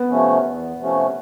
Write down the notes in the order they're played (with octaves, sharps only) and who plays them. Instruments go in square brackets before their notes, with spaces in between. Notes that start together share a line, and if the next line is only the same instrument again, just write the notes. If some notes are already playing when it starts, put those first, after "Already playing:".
Already playing: [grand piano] B3
[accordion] C3 F3 A3 C#4
E2
C3 F3 A3 C#4